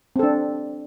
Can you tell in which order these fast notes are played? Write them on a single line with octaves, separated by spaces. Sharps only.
C4 A4 D4